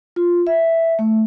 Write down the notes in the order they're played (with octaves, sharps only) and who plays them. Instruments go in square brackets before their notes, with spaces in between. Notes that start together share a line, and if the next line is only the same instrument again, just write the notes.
[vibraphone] F4
E5
A3